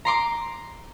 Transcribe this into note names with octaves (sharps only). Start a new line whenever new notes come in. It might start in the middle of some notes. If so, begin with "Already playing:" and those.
A#5 C6 D6